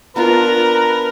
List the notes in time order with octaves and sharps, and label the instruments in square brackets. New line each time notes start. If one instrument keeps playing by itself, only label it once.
[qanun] B3 D4 F4 [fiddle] A#4 [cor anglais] B4 [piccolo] A#5